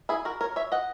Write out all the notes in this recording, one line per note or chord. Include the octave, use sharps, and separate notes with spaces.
E4 G#4
F#4 A#4
A#4 C#5
C#5 E5
D#5 F#5